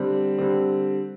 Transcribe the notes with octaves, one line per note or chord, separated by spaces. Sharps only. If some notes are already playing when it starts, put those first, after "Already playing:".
Already playing: D3 G3 C4
D3 G3 C4